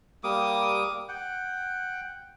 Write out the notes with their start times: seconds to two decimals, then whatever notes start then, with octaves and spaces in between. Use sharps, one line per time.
0.24 G3 A#3 D6 D#6
1.09 F#5 G5